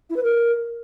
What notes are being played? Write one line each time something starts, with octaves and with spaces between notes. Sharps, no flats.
E4
B4
A#4